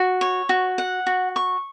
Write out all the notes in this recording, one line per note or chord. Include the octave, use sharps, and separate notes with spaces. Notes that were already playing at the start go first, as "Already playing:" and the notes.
Already playing: F#4
C#5
F#4
F#5
F#4
C#6